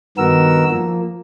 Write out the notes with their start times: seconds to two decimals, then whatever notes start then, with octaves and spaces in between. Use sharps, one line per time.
0.18 G2 D#3 B3 F#4 A#4 E6
0.71 F3 A#3